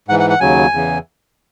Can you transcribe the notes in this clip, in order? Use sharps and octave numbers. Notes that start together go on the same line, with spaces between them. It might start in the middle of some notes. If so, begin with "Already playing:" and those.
G#2 E3 F#5
F#5
F#5
D#2 C#3 F#3 G#5
E2 C#3 E3